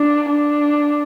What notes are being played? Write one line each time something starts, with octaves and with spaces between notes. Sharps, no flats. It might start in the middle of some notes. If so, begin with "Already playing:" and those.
Already playing: D4
D4